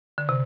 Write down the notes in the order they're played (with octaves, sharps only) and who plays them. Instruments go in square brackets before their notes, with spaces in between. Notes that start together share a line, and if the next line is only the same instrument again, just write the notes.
[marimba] D3
C3